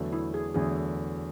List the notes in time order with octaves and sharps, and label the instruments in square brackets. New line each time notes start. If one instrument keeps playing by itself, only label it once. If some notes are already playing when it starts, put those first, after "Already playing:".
Already playing: [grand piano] E2 D3 F#3 A3
[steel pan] E4
G#4
[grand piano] E2 D3 F#3 A3 [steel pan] G#4